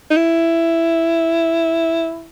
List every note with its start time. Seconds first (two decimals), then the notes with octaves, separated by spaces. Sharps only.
0.10 D#4
0.17 E4